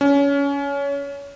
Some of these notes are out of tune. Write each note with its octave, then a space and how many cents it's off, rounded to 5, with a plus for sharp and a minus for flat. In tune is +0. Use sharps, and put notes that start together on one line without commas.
C#4 +25